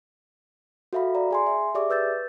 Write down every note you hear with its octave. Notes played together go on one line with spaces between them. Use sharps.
F#4 A4 E5 F5 B5
D5 A#5
G#4 G#5 C6
E5
G4 G#4 D5 E5 C#6 D6
B4 E6 G6 A6